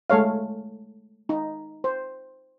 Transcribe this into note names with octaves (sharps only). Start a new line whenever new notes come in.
G#3 A3 A4 C#5 F5
D#4
C5